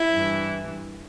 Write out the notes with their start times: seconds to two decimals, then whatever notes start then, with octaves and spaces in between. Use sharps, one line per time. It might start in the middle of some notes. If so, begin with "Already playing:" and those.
Already playing: E4
0.13 G2 E3